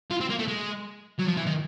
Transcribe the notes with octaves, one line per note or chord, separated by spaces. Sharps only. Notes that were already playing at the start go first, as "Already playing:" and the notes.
F4
C4
A#3
A3
G#3
F#3
F3
E3
D#3